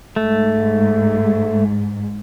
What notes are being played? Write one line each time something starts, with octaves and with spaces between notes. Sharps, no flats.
G#2 A3